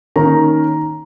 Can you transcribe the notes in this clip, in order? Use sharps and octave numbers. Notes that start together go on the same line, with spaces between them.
D#3 A#3 C#4 A#5